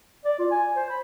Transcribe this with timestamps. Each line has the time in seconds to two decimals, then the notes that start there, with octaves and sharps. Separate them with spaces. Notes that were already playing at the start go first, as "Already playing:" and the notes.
0.25 D5
0.39 F4
0.51 G#5
0.76 C5
0.90 B5